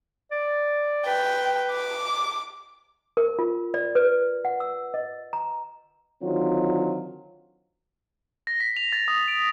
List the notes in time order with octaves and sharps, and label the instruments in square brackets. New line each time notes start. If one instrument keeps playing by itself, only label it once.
[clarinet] D5
[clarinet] B4 [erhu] G5
[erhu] D6
[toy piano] A#4
F4
D5
B4
F#5
E6
D#5
A#5
[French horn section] D3 D#3 F#3 C4 F4
[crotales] A#6
B6
F7
A6
D#6
D7